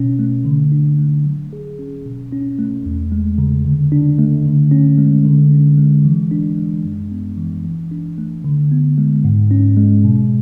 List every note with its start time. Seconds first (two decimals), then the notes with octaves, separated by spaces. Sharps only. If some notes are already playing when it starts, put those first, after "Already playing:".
Already playing: B2 C#4
0.19 A3
0.45 D3
0.72 D4
0.99 A3
1.25 F#3
1.53 G#4
1.79 C#4
2.06 B2
2.32 C#4
2.59 A3
2.86 E2
3.12 G#3
3.38 C#3
3.65 D3
3.92 D4
4.19 A3
4.45 D3
4.72 C#4
4.98 G#3
5.25 D3
5.51 C#4
5.78 G#3
6.05 E3
6.31 D4
6.58 G#3
6.85 F#2
7.11 B3
7.38 E3
7.65 E3
7.91 D4
8.18 A3
8.44 D3
8.71 B3
8.98 G#3
9.25 G#2
9.51 C#4
9.77 G#3
10.05 B2